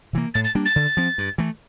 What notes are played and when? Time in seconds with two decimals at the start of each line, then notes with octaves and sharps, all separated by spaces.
0.13 C3 E3 A#3
0.34 A2 A6
0.44 A6
0.55 G3 A#3 D4
0.65 A6
0.76 D3
0.97 F3 C4
1.18 G2
1.38 E3 A3